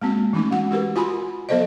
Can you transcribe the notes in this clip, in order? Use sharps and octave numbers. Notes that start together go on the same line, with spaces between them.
G#3 A#3 C4 F#4
E3 A3 C#4 D#4
G#3 F#4 F#5
F#4 G4 A#4 B4
F4 F#4 G#5 B5 C6
F#3 B3 A4 C5 D5 D#5